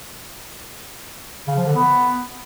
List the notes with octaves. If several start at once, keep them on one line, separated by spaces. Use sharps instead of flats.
C#3
F3
D3
B3